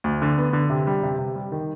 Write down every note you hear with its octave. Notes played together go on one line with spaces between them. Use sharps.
D2
D3
B3
D3
C3
G3
C3
C3
G3
D#3